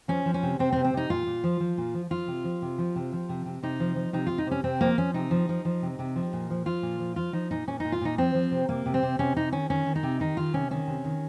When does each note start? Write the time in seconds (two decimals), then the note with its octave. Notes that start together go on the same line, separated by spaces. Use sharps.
0.08 F3 C#4
0.26 F3
0.34 C#4
0.43 C3
0.59 C3 C4
0.72 C4
0.76 C3
0.84 C4
0.93 C3 D#4
1.10 A#2 F4
1.27 A#2
1.44 F3
1.60 F3
1.78 A#2
1.94 F3
2.10 F3 F4
2.28 C3
2.44 F3
2.62 C3
2.78 F3
2.96 C3
3.12 F3
3.29 C3
3.46 C3
3.63 C3 D#4
3.80 F3
3.96 F3
4.13 C3 D#4
4.27 C3 F4
4.38 D#4
4.47 C3 C#4
4.64 C3 C4
4.80 F3 A#3
4.98 F3 C#4
5.14 C3 D#4
5.31 F3
5.49 F3
5.65 F3
5.82 C3
5.99 C3
6.16 F3
6.33 A#2
6.50 F3
6.66 F3 F4
6.82 A#2
6.99 F3
7.16 F3 F4
7.33 F3 D#4
7.51 A#2 D#4
7.67 A#2 C#4
7.80 A#2 D#4
7.92 F4
8.01 A#2 D#4
8.18 F3 C4
8.34 F3
8.51 C3
8.69 C3 A#3
8.86 C3
8.94 C4
9.03 C3
9.19 C3 C#4
9.36 C3 D#4
9.52 D#3 C#4
9.70 D#3 C#4
9.86 D#3
9.96 D#4
10.03 C3
10.20 D#3 D#4
10.37 D#3 F4
10.54 C3 C#4
10.71 D#3 C#4
10.87 C3
11.05 D#3